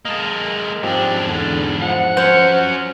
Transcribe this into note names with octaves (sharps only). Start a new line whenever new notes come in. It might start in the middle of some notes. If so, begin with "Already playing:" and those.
G#3 A#3 D#5 A5
G#2 F3 C4 D4 G4
E2 D3
F3 F#5
F#3 C#4 C5